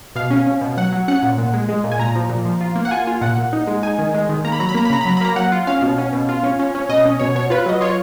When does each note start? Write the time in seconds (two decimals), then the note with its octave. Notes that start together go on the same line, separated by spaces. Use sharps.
0.15 B2 F5
0.31 C#4
0.47 C#4
0.61 B2
0.77 F#3 F#5
0.93 F#3
1.08 C#4 F#5
1.23 A#2
1.38 A#2
1.54 G#3
1.69 G#3
1.84 A#2
1.92 G#5
1.99 A#2 A#5
2.15 F3
2.30 A#2
2.45 F3
2.61 F4
2.76 A#3
2.85 F#5
2.91 F4 G#5
3.07 F4
3.21 A#2 F#5
3.37 A#2
3.53 D#4
3.67 G#3
3.83 D#4 G#5
3.98 D#3
4.14 G#3
4.29 D#3
4.44 A#3 A#5
4.52 B5
4.59 F#3 A#5
4.69 B5
4.75 A#3 A#5
4.85 B5
4.90 C#3 A#5
5.01 B5
5.06 F#3 A#5
5.17 B5
5.21 A#3 A#5
5.36 F#3 F#5
5.52 F4
5.67 C#4 F5
5.82 B2
5.98 C#4
6.13 B2
6.29 F4
6.43 C#4
6.59 C#4
6.75 C#4
6.89 B2 D#5
7.05 C#4
7.19 B2 C#5
7.35 B2 C#5
7.50 F4 B4
7.66 F#3 D#5
7.81 F4 C#5